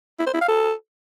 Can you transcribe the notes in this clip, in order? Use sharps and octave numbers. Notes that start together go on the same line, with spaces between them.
E4
C5
E4
F5
A4